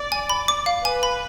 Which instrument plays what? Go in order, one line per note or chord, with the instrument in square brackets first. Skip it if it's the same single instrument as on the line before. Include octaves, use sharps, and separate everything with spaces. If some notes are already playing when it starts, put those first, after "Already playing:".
Already playing: [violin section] D5
[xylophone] G#5
B5
D6
F5
[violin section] B4 [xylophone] G#5
[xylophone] B5